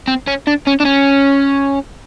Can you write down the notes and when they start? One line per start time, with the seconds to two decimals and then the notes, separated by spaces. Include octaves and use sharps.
0.07 C4
0.27 C#4
0.47 D4
0.67 C#4
0.80 D4
0.85 C#4